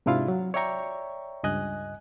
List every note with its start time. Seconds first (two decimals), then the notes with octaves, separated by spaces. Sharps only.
0.06 G#2 C3 D4 E4 F4 F5
0.28 F#3
0.54 C#5 D5 E5 G5 A#5 C#6
1.43 C#2 G2 D#5 G#5 F#6